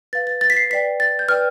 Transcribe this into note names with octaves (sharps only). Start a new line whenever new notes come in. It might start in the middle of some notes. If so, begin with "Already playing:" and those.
B4 F5 A6
A6
A6
B6
C7
B4 D5 G5 B6
A6
G6
B4 D5 G5 F6